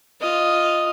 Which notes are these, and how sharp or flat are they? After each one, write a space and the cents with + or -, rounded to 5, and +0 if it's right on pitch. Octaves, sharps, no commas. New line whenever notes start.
F4 +0 D#5 +0